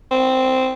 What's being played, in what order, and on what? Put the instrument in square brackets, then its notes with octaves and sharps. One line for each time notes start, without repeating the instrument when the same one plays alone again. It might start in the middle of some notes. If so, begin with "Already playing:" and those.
[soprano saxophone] C4